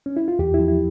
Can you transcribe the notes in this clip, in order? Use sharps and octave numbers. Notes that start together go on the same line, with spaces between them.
C#4
E4
F4
E2 G4
E4
F3
E4